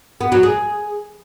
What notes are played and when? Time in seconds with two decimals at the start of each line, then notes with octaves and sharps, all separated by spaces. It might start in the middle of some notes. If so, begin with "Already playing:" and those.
0.21 B3
0.32 F#3
0.43 G#4